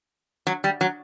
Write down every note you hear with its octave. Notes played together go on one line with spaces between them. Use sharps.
F#3
G3
F#3